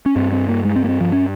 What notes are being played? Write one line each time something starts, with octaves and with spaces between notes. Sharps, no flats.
C#4
G2 C4
C4
A#3
G#3
C4
A#3
C4
F3
C#4